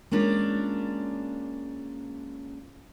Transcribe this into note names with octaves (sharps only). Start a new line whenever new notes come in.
G#3 A#3 C#4 D4 F4